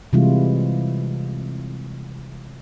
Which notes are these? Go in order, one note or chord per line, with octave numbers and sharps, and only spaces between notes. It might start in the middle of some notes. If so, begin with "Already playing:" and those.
C3 E3 G3 G#3 E4 F4